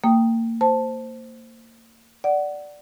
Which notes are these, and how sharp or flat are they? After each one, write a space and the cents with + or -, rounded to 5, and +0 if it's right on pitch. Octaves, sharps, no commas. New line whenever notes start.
A#3 -30 G5 +0 D#6 +0
C5 +0 A5 +0
D5 +0 F#5 +15